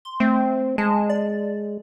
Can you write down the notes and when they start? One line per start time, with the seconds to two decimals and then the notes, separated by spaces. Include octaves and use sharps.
0.05 C6
0.20 A3 C4
0.78 G#3 A5
1.10 D5